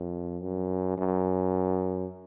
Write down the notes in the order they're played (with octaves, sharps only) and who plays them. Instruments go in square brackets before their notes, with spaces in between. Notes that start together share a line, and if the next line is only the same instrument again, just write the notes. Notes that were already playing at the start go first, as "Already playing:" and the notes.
Already playing: [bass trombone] F2
F#2
F#2